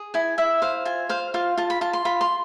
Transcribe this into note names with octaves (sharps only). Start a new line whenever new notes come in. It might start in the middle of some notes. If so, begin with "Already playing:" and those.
Already playing: G#4
E4 G#5
E4 E5
C5 F5
F4 G#5
C5 F5
F4 F5
F4 A5
B5
F4 A5
C6
F4 B5
C6